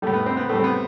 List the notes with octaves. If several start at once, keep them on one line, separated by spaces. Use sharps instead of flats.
A2 G3 A3
B3
C4
B3
A2 G3 A3
C4
B3